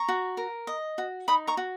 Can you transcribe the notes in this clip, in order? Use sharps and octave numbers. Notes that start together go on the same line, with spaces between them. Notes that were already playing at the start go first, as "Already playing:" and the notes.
Already playing: A#5 C#6
F#4
A#4
D#5
F#4
D#4 B5 D#6
A#5 C#6
F#4